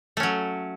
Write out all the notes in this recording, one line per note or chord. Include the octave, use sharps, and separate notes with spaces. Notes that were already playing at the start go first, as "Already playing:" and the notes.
F#3 A3 C#4